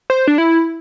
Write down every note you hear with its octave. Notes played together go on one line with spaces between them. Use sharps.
C5
D4
E4